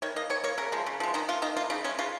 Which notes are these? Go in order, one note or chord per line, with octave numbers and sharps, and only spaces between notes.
D#3 C#5
A#3 D#5
D#3 C#5
A#3 C#5
C#3 A#4
F3 G#3
C#3
F3 G#3
D#3 D#4
A#3 F4
D#3 D#4
A#3 F4
C#3 D#4
G#3 C#4
C#3 F4